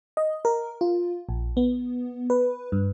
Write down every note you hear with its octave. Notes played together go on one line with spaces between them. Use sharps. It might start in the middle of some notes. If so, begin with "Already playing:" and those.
D#5
A#4
F4
A#1
B3
B4
G2